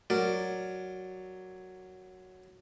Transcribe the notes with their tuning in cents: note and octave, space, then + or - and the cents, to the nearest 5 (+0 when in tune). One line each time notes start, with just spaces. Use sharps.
F#3 +0 A#4 -10 D5 +0